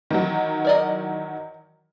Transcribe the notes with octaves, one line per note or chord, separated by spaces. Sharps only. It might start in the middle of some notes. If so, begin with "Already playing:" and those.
D#3 E3 F#3
A#4 D5 D#5